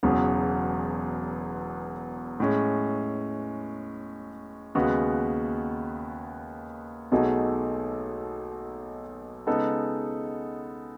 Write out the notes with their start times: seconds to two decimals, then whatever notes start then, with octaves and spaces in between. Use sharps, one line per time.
0.03 E1 E2 C#3 F#3 B3
2.40 A2 G#3 C#4
4.75 D#2 C#3 G#3 B3 F#4
7.12 B1 B2 A3 D#4 G#4
9.47 C#3 G#3 B3 D#4 A4